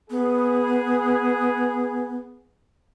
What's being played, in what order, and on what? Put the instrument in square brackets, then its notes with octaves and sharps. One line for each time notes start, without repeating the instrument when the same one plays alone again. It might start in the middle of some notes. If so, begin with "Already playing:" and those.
[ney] B3 [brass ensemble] G#4